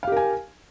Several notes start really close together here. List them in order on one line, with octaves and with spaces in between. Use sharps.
F5 G4 A#4 G#5